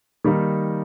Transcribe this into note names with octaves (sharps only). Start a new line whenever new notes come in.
D#3 G3 A#3 D#4